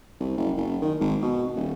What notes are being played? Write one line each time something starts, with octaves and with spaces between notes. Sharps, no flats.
C2
F#1
F#1
D#3
G#1
B2
D#1